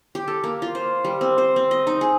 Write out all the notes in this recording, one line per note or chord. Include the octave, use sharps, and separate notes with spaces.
G4
A4
A#3
F4
C5
G3
C4
C5
C4
D#5
D#4
G#4